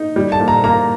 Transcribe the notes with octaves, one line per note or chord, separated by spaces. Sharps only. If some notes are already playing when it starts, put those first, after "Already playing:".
Already playing: D#4
G3
A5
A#2
A#5
A#3 A#5